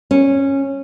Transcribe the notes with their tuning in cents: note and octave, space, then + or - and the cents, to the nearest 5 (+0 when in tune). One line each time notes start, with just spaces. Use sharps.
C#4 -15